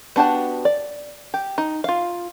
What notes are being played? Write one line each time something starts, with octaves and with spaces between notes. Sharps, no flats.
B3 D4 F#4 G4 A5
D5
G4
D#4
F4 F5